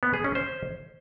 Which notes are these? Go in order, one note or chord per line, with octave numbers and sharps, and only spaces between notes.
B3
G#4
C#4
C5